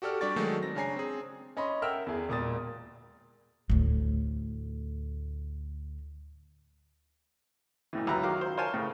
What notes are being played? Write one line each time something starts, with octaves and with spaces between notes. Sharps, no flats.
F#4 G4 A4 D5 F6
G3 D4 G4 D5 C#6 A6
D#3 F#3 G#3 A3 D#4
C4 A#6
C#3 D4 C#5 G#5 A#5 C7
C4 G#4
C#4 D#5 B5 C6
A#4 E5 F#5 G5 E6 F6
E2 G#4
E1 A#2 D#6 A6
D2 A2
B1 A2 E3
C#2 F#2 F#3 B4 E5 A#5
D#3 F#3 F5 D6
C5
A#4 C5 C#5 F5 G#5 A5
A2 C#3